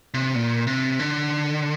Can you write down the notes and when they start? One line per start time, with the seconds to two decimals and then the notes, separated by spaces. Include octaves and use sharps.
0.14 C3
0.35 A#2
0.67 C3
0.99 D3